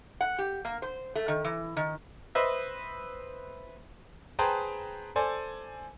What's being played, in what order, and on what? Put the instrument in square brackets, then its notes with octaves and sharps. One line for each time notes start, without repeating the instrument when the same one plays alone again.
[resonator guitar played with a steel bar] F#5
G4
A#3
C5
A3
D#3
E3
D#3
[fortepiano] B4 C5 D#5 E5
[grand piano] G#4 B4 C5 G5 A5 A#5
A4 C5 D5 G#5